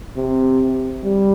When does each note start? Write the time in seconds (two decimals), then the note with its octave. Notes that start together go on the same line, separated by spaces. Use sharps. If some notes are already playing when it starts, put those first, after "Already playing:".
0.16 C3
1.04 G3